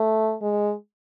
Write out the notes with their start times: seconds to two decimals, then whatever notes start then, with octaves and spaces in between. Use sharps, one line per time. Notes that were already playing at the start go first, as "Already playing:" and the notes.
Already playing: A3
0.42 G#3